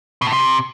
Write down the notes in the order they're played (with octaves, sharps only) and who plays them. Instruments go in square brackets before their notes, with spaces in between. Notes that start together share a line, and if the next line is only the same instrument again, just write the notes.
[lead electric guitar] B2
A2
C3